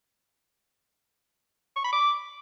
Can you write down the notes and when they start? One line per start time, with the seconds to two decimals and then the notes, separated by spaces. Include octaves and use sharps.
1.76 C#6
1.84 B5
1.92 D6